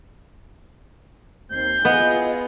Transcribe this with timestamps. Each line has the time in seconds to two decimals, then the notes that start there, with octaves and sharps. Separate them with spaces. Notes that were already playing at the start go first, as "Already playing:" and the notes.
1.52 D#2 C4 G6 C7
1.85 B3 E4 F4 G#4 D#5